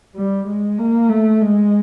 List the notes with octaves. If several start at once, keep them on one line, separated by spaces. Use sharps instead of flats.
G3
G#3
A#3
A3
G#3